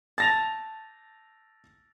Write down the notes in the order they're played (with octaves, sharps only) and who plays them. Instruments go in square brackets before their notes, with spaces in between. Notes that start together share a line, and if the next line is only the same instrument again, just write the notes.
[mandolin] A5 [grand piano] A6 A#6 F7